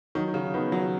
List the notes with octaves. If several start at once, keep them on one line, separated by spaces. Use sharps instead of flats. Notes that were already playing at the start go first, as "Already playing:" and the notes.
D#3 F#3
C#3
D#3 B3
F#3